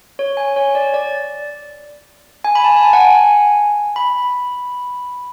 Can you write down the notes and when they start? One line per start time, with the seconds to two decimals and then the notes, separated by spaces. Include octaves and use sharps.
0.19 C#5
0.37 G#5
0.56 C#5
0.75 D5
0.94 D5
2.45 G#5
2.55 B5
2.64 A5
2.77 A5
2.83 G#5
2.93 F#5
3.01 G#5
3.96 B5